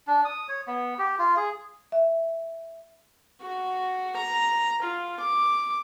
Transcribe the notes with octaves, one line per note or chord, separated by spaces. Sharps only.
D4
D#6
C#5
B3
G4
F4
G#4
E5
F#4
A#5
F4
D6